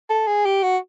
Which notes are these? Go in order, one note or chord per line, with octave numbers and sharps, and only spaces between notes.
A4
G#4
G4
F#4